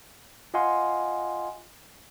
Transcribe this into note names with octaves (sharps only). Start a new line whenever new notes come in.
F4 D#5 F5 F#5 G#5 C6